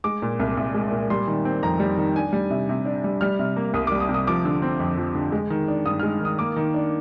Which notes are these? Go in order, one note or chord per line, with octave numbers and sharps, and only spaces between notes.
G#3 D6
A#2
C2
C2
G#3
A#2
G3 C6
D#3
C4
F2 A#5
G3
D#3
D4 G#5
G3
C3
C3
D4
G3
G3 F6
C3
A#3
C2 D#6
D6
G3
D#6
C3
D#6
F3 D6
D3
C4
F2
F3
D3
G#3
D#3
D4
G2 D#6
G#3 F6
D#3 D#6
A#3 D6
D#3
D4